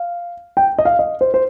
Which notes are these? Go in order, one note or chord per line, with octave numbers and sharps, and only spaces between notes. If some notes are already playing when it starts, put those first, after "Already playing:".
Already playing: F5
G5
D#5
F5
D#5
C5
C5